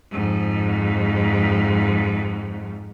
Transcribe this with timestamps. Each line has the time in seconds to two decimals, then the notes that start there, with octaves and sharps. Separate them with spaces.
0.12 F2 G#2